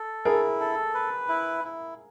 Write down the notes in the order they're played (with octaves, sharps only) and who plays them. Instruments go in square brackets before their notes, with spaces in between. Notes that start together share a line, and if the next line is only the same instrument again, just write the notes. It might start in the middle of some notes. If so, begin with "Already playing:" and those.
Already playing: [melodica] A4
[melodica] E4 [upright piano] G#4 A#4
[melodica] A4
B4
E4
E4